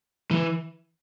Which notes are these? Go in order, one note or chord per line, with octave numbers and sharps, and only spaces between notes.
E3